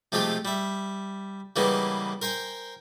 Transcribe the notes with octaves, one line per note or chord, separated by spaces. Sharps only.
C3 F3 G#3 A3 G4 A4
G3 E5
C#3 E3 G3 G#3 A#3 B3
A#4 C5 G5 G#5